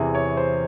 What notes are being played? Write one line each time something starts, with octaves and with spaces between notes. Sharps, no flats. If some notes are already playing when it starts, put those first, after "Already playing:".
Already playing: E2 C3 E3 G#4
C#5
C5